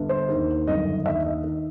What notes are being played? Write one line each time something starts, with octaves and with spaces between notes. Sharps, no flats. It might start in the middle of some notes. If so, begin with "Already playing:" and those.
Already playing: G1 G2
C5
D#2 D#3
G1 F#2 D#3 D#5
D#2 D#3 E5
D#5
D#3